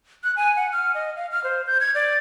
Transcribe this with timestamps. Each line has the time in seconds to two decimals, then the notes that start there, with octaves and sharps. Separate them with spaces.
0.24 F#6
0.36 G#5
0.56 F#5
0.73 F6
0.95 D#5
1.16 F5
1.32 F6
1.44 C5
1.67 G6
1.80 G#6
1.95 D5